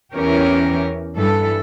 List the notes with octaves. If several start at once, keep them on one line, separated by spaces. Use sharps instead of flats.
E2 E3 C#4 G4 A#4
G2 E3 A4